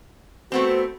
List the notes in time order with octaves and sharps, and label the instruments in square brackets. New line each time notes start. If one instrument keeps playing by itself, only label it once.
[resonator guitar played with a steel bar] A3 B3 C4 [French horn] F#4 [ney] C5